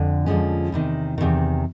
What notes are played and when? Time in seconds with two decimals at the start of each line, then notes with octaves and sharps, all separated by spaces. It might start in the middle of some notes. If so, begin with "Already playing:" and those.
Already playing: F2 D3
0.26 F2 D3 F3 G#3 C#4
0.72 E2 C3 D#3
1.18 E2 C3 D#3